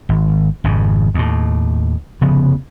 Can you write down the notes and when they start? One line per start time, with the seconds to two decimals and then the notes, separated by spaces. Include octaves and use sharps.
0.09 G#1
0.64 G#1 F2 C#3
1.14 D#2 A2
2.21 F1 C#3 F3 B3